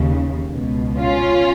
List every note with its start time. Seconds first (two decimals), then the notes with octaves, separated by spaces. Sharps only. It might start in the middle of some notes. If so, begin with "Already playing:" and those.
Already playing: D#2 C#3
0.53 C#2 B2
0.98 C#4 F4